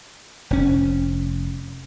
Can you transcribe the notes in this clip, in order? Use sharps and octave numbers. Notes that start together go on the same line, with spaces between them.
F1 C#4